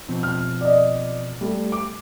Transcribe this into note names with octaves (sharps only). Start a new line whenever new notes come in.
B2 F3 C4
F6
D5 D#5
G3 A3
D6